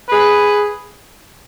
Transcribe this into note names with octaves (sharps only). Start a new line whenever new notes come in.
G#4 B4